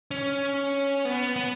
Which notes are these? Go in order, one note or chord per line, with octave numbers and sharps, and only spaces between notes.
C#4
B3
B3